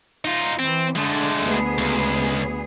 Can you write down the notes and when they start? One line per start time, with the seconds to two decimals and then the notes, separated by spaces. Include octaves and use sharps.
0.25 D#4 F4
0.60 E3 C4
0.96 D3 G#3 A3
1.42 D2 B3 G#4
1.78 C#2